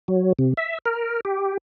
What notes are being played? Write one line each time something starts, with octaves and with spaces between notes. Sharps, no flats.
F#3
C3
E5
A#4
G4